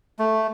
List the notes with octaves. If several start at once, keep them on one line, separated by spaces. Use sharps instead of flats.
A3